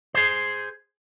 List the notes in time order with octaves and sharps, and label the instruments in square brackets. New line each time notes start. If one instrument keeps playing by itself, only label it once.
[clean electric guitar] G#4 C5